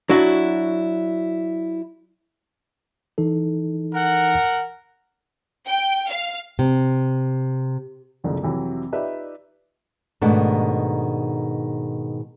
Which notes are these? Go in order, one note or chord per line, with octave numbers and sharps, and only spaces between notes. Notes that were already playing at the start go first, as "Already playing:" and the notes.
F#3 D4 E4 F#4
E3 D#4 A4
A#4 F#5
G5
F5
C3
F#1 C2 D3 F3 G#3 G#4
F2 C3 E3 F#3
D#4 F4 G4 B4 D5 E5
G#2 B2 D#3 A3 D4